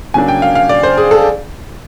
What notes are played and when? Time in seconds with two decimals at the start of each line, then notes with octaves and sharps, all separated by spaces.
0.14 C#3 F#3 A#3 D4 G#5
0.28 G5
0.42 F5
0.55 F5
0.69 D5
0.83 C5
0.97 G#4
1.11 A4